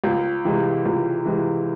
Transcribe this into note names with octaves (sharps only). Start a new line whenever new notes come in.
C#2
C3 E3 G#3
C#2
C3 E3 G#3